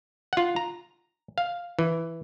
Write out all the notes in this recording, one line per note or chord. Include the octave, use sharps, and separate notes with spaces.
F4 F#5
A#5
F5
E3